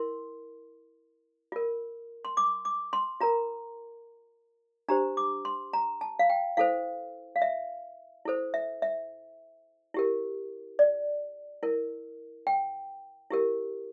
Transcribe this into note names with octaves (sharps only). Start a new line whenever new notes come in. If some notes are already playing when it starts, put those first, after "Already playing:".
Already playing: E4 A#4 C6
F4 A#4
C6
D6
D6
C6
F4 A#4 A#5
D4 G4 C5 A#5
D6
C6
A#5
A5
F5
G5
E4 A4 C5 F5
F5
E5
E4 A4 C5
E5
E5
E4 G4 A#4
D5
E4 A#4
G5
E4 G4 A#4